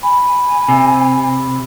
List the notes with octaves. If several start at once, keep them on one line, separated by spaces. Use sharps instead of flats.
G#5 B5
C3